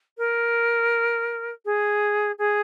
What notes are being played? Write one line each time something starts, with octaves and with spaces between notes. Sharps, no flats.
A#4
G#4
G#4